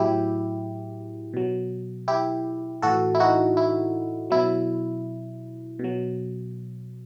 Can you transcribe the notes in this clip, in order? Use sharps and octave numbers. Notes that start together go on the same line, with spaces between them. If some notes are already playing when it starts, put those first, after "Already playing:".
Already playing: A2 F#3 E4 G4
B2 F#3
E4 G4
A2 E3 F#4 A4
E4
D#4 F#4
E4
B2 F#3 E4
B2 F#3